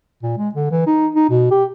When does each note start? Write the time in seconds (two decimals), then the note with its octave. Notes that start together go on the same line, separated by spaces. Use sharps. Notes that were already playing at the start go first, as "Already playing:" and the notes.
0.23 A#2
0.38 G#3
0.55 D3
0.71 E3
0.87 D#4
1.15 D#4
1.30 B2
1.51 G4